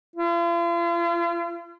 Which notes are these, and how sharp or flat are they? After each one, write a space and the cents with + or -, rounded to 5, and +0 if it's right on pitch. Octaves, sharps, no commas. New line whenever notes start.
F4 -40